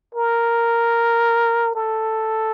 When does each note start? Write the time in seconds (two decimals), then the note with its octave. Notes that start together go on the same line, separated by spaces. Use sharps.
0.15 A#4
1.75 A4